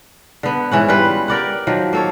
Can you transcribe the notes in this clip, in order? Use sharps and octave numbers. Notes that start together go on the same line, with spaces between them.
D3 B3
G#2 E3 C#4 F#5
G3 F4 B4
G4 A#4 D5 F#5
D#3 F3 F#3
A#3 A4 C#5